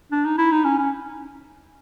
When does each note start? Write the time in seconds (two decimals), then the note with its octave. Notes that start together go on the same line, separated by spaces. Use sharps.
0.12 D4
0.25 D#4
0.38 E4
0.52 D#4
0.65 C#4
0.78 C#4